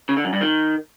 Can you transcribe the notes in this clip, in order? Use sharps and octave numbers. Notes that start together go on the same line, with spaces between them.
C#3
D3
F#2
G2
D#3